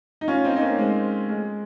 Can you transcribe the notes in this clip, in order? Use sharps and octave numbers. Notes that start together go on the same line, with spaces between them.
D#4
C#4 F4
C4 D#4
D#4
A#3 C#4
G#3 C4
G#3